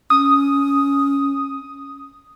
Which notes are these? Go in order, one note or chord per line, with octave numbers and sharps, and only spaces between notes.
C#4 D#6